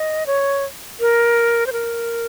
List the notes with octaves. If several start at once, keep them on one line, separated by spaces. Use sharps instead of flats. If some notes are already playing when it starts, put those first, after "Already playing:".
Already playing: D#5
C#5
A#4
C5
A#4